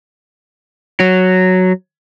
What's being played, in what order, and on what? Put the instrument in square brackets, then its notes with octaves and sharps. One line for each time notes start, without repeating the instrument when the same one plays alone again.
[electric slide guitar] F#3